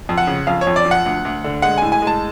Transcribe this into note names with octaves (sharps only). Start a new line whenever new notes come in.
F2
F#5
C#3
F2 F5
C#5
F2
D5
F3
F#5
D2
D2
D3
G#3 F#5
A2 G#5
G#5
G#3
A5